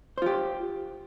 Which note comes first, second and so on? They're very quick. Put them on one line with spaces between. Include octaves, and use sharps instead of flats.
C5 F4 G4